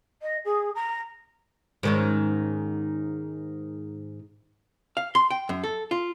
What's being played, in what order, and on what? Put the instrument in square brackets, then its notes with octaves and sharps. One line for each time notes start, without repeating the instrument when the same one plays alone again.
[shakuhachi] D#5
G#4
A#5
[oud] G#2 D#3 C#4
[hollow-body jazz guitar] F5
C6
G5
F#2
A4
F4